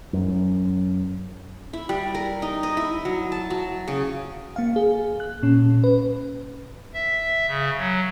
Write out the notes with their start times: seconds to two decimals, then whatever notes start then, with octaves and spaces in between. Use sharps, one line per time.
0.13 F#2
1.73 E4
1.89 G3
2.15 A#4
2.42 D#4
2.63 D#5
2.77 E4
3.05 F#3
3.32 A5
3.50 F#3
3.88 C#3
4.56 A#3 F5
4.76 G#4
5.20 F#6
5.43 A#2 C#4
5.84 B4
6.94 E5
7.47 C#3
7.78 F#3